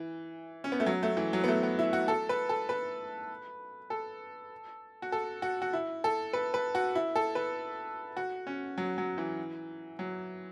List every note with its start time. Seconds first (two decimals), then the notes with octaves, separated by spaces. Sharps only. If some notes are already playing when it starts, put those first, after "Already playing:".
Already playing: E3
0.64 C#4
0.72 B3
0.80 A3
0.86 F#3
1.03 A3
1.17 E3
1.33 F#3
1.44 B3
1.48 A3
1.63 B3
1.79 E4
1.93 F#4
2.08 A4
2.29 B4
2.49 A4
2.69 B4
3.90 A4
5.02 F#4
5.12 A4
5.42 F#4
5.62 F#4
5.73 E4
6.04 A4
6.33 B4
6.54 B4
6.75 F#4
6.95 E4
7.16 A4
7.35 B4
8.17 F#4
8.47 C#4
8.78 F#3
8.98 F#3
9.18 E3
9.99 F#3